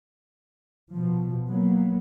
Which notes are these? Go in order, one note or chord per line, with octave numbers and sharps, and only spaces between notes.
B2 F3
F#3 A#3 B3